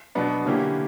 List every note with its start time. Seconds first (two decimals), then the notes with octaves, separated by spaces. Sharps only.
0.15 B2 F#3 B3 D4
0.46 D3 A#3 C#4 E4 G4